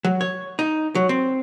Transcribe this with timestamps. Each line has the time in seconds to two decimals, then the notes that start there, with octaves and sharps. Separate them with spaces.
0.05 F#3
0.21 C#5
0.59 D#4
0.95 F#3
1.09 C4